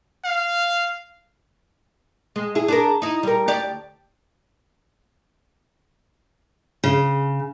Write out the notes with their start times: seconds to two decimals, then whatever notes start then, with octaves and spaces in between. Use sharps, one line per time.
0.24 F5
2.36 G#3
2.55 E4 G#4
2.68 D4 G#4 A#4
3.02 D#4 E4
3.23 G3 A#4
3.47 D2 G4 D5
6.84 C#3